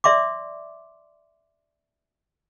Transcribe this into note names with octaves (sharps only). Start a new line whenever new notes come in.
D5 E5 C6 D6